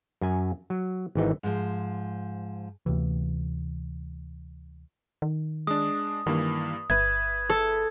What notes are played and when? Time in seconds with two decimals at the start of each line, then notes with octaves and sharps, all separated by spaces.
0.21 F#2 G#5
0.70 F#3
1.15 G#1 E3 D#4
1.43 G#2 F3
2.86 D2 C3 E3
5.22 D#3
5.67 G#3 D4 D#6
6.27 G2 D#3 E3 A#3
6.90 G1 B4 E5 G#6
7.50 A4